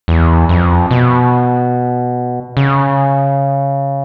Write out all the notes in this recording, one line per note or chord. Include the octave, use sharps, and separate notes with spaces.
E2
F2
B2
C#3